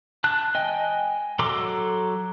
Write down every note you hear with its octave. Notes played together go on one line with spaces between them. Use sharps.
A5 F#6
D#5 G5 G#5
F#3 A4 A#5 C6 D6